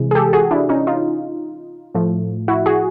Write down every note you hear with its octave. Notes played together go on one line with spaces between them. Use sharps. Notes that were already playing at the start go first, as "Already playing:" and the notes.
Already playing: C3 E3 G#3
G#4
G4 A4
F#4 G#4
D4 E4
C#4 D#4
D#4 F4
A2 F3 A3
E4 F#4
F#4 G#4